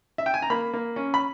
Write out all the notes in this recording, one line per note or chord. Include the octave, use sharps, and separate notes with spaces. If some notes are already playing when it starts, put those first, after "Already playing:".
E5
G5
G#5
A#5
A#3 B5
A#3
C#4
B5